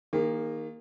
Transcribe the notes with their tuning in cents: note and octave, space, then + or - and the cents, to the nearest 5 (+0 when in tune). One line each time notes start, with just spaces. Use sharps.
D#3 +0 A#3 +0 G#4 -45